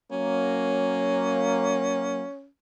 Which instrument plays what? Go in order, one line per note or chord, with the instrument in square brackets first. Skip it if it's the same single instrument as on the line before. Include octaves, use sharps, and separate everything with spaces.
[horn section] F#3 A#3 [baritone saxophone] C#4